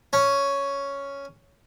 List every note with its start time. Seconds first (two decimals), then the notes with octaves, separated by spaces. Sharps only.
0.13 C#4